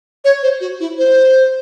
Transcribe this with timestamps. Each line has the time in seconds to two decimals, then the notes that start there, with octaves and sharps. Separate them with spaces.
0.25 C#5
0.43 C5
0.61 F#4
0.80 E4
0.98 C5